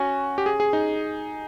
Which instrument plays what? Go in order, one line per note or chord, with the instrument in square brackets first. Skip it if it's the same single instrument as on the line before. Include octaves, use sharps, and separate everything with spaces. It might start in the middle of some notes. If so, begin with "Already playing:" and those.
Already playing: [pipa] C#4 [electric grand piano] F#4
[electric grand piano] G4
G#4
G#4
D#4